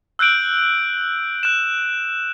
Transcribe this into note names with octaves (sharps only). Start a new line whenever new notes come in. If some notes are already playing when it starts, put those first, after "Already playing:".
E6 F#6 G6 D7 F#7
F#6 E7